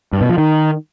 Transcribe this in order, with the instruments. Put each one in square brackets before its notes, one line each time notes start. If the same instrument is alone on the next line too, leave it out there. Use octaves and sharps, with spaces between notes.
[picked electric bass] G2
B2
F3
D#3